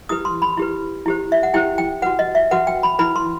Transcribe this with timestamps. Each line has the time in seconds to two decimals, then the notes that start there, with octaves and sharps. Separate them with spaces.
0.09 E4 G4 B4 D#6
0.25 C6
0.42 B5
0.57 E4 G4 B4
1.06 E4 G4 C5
1.32 E5
1.43 F#5
1.54 E4 G4 C5 G5
1.78 G5
2.02 F#4 B4 F#5
2.19 D#5
2.35 E5
2.51 F#4 B4 F#5
2.67 G5
2.83 B5
2.99 E4 B4 B5
3.16 C6